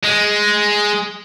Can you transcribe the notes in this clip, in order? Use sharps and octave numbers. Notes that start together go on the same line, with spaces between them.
G#3